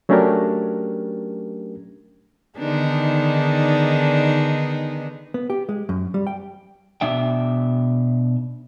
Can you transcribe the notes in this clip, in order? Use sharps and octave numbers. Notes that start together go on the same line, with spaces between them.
F#3 A3 C#4 D4 G4 A#4
D3 D#3 B3 D4 D#4 G#4
B3
G4
G#3
F#2
G3
G5
B2 D4 E5 G5